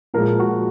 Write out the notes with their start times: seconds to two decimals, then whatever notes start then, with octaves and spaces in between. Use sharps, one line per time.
0.14 A#2 F3 G#3 A#4
0.40 F#4